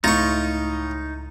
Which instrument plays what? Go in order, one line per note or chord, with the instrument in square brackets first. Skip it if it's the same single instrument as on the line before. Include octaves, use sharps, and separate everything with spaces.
[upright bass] C#2 [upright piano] A2 [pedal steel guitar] D#4 [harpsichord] F4 C#6